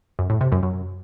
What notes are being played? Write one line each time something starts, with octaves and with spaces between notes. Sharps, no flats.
F#2
A2
C3
F#2
F#2